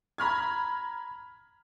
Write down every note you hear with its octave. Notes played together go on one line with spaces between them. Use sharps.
A#5 B5 F6 G#6